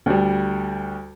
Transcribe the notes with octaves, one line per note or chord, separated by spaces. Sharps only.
D2 G3